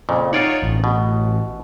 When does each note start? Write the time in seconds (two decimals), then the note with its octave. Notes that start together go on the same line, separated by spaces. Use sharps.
0.09 F2 A#2 C#3
0.33 D#4 F4 C#5 D5 F#5
0.62 A1
0.84 B2